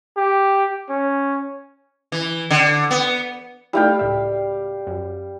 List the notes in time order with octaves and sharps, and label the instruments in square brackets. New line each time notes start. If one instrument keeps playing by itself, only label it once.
[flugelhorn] G4
C#4
[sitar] E3
D3
B3
[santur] G3 F5 G5 [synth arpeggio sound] A3 D#4 E4
[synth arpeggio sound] C#2 A2 E5
F#2